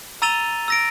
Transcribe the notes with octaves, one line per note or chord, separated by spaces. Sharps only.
A#5 E6 A6 D#7 F7 G7
E6 A#6 D7